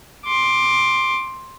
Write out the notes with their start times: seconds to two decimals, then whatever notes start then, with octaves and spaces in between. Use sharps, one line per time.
0.25 C6 D6